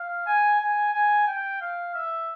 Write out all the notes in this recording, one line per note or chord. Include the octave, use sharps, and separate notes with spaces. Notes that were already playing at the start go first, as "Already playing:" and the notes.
Already playing: F5
G#5
G#5
G#5
G5
F5
E5